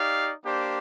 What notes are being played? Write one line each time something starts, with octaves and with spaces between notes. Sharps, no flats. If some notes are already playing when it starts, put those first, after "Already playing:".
Already playing: D#4 G4 D5 F5
A#3 D4 G4 C5